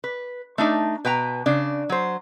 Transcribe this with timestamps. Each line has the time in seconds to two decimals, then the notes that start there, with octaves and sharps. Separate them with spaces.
0.04 B4
0.58 A3 D4 D#4
1.05 B2 B4 G5 A#5
1.46 C#3 D4
1.89 F#3 C5